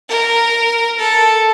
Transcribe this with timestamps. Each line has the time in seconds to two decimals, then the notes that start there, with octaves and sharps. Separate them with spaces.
0.09 A#4
0.99 A4